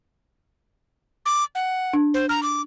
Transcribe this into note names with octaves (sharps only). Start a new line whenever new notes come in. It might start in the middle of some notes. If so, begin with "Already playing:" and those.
D6
F#5
D4
C5
A#5 F6
D6